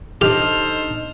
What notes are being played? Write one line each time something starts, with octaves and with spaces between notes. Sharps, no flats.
D4 D#4 G4 A4 C5 D#5 F6 F7